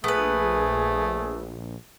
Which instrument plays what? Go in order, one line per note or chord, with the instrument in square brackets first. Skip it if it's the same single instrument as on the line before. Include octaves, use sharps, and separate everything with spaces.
[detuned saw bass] A#1 [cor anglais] A3 [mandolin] B3 B4 [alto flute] G#4